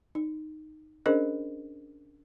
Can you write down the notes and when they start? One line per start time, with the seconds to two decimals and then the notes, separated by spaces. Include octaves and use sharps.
0.15 D#4
1.06 C#4 D4 G#4 A#4 C5 D#5